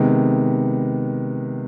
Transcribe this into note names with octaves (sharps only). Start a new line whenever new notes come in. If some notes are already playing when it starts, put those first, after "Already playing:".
Already playing: C3 D#3 G#3 B3